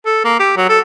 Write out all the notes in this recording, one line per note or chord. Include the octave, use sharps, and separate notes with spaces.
A4
A#3
G4
F#3
A4